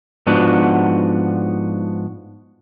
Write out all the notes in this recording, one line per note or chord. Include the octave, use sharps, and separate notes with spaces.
G#2 F3 B3 D4 F#4